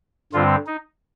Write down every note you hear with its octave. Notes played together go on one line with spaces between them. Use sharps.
G2 D3 G3 C4 F4
D#4